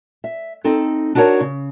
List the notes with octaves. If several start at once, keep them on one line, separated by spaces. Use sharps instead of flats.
E5
C4 D#4 A4
D4 D#4 F#4 A#4 C#5 A5
C#3